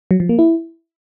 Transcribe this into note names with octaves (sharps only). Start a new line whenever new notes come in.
F#3
F3
A#3
E4